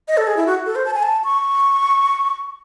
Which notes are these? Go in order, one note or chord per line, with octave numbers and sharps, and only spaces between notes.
D#5
A4
G#4
E4
F#4
A4
C5
A5
G#5
A5
C#6